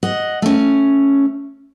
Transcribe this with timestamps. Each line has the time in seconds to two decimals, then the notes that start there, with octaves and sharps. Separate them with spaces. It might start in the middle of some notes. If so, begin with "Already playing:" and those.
0.03 D#5 F#5
0.42 A3 C#4